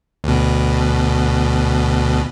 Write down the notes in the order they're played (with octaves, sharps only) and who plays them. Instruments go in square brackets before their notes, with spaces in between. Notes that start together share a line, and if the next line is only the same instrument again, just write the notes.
[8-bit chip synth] D2 B2